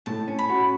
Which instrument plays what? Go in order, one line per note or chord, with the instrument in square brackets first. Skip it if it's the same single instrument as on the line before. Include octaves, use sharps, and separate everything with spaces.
[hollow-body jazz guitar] A2 [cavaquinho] A5
[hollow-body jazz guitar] C#4
[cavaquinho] B5
[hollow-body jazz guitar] F#4